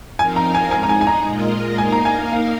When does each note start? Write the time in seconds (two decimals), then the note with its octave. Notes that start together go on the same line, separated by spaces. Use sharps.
0.18 F3 C4 D#4 A#4 F5 G#5
0.36 A#5
0.55 G#5
0.71 G#3 D#4 G#4 G#5
0.83 A#5
0.89 G#5
1.01 G#5
1.07 A#5
1.25 A#2 G#3 F4 A#4 D#5
1.78 A#3 D#4 A#4 F5 G#5
1.92 A#5
2.05 G#5
2.32 F5